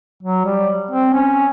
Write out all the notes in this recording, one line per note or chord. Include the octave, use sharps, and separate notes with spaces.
F#3
G3
C4
C#4